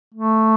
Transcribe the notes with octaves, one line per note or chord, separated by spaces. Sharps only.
A3